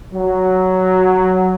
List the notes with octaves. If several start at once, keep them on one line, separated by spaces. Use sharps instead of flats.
F#3